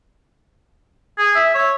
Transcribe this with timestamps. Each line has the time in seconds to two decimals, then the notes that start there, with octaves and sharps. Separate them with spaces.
1.18 G#4
1.35 E5
1.55 C#5